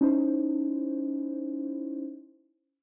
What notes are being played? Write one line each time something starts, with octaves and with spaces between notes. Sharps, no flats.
C#4 D#4 E4 C5